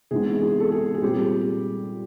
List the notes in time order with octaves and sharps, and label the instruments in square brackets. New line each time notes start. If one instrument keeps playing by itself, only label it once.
[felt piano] C3 E3 G#3 B3 D#4 G#4
G#4
A4
G#4
G#4
A#2 G3 C4 G4